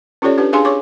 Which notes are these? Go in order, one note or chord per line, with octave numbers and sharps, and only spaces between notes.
C#4 F4 G4 A4 C#5 D5
D4 G4 B4
D4 G#4 F5 G#5 C6
G#4 C#5 C#6 D6